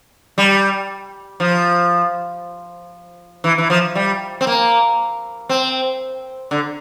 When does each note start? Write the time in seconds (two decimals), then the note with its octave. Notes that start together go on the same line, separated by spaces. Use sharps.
0.38 G3
1.40 F3
3.44 E3
3.58 E3
3.70 F3
3.95 G3
4.41 C4
4.47 A#3
5.49 C4
6.51 D3